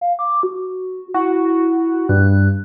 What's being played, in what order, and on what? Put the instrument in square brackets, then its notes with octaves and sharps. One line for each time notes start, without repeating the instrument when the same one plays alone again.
[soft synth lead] F5
D6
F#4
[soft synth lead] E4 [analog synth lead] F#4
[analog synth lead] G2 [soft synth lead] F#6